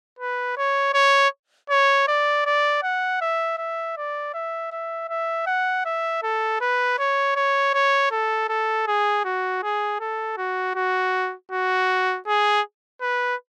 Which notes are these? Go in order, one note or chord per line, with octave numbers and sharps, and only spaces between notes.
B4
C#5
C#5
C#5
D5
D5
F#5
E5
E5
D5
E5
E5
E5
F#5
E5
A4
B4
C#5
C#5
C#5
A4
A4
G#4
F#4
G#4
A4
F#4
F#4
F#4
G#4
B4